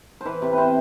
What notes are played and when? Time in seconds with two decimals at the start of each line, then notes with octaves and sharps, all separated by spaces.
0.21 E3 B4 C5
0.42 C3
0.53 C3 B4 C5